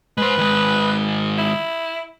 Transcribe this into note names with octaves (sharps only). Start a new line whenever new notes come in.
G#3 B4 C5
D#3 G#3
E4